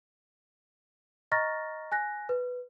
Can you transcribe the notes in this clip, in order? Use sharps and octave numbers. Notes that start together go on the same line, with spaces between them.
D#5 A#5 C#6 F6 A6 A#6
G#5 F#6 A#6
B4